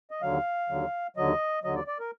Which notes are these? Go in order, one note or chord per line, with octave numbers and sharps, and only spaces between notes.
D#5
D#2 D3 F#3 F5
D#2 D3 F#3
D#2 D3 F#3 D#5
D#2 D3 F#3 D#5
D5
D5
A#4